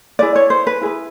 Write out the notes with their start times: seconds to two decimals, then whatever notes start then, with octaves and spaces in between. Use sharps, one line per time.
0.19 E4 G#4 B4 D5
0.36 C#5
0.50 C5
0.67 B4
0.81 E4 G#4 B4